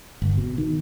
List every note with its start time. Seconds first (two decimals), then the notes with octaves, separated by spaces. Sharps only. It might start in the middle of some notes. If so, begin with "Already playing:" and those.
0.22 G1
0.37 B2
0.58 D#3